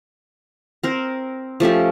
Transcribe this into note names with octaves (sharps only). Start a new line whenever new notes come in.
C4 A#4 C5
F3 A3 C#4 G4